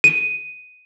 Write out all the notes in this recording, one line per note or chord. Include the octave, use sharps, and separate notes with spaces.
D#7